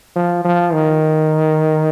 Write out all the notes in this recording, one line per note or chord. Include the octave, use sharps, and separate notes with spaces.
F3
F3
D#3